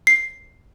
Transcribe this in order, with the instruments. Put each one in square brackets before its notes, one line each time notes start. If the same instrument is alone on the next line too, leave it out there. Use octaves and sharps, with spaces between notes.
[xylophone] C7